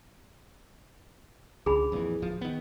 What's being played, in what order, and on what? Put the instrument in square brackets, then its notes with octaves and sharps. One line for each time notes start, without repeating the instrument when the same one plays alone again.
[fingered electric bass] C#2 D3 [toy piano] G#4 B5
[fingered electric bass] F2 A#2 E3
D1 F3
D#3 B3